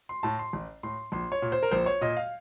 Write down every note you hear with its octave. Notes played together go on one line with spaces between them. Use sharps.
C6
A2 A5
C6
A1
A2 C6
A#1 C6
C#5
A#2
C5
A#4
A#1 C5
C#5
A#2 D#5
F5